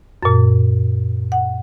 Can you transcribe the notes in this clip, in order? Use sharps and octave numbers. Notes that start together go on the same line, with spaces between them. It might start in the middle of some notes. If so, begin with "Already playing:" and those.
F#2 A#2
F#5